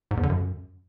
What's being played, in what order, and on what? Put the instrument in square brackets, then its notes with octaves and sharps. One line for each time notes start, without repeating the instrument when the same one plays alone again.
[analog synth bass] G#2
E2
D3
F#2